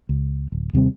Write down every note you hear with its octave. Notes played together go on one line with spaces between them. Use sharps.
C#2
D1
D#2 C3 G3 C4